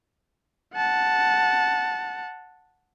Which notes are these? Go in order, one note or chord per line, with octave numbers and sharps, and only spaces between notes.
F#5 A5